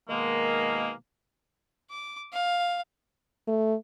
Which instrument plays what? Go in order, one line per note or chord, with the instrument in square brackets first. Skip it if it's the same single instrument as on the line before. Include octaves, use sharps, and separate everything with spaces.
[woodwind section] B2 D#3 G#3 A#3
[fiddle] D6
F5
[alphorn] A3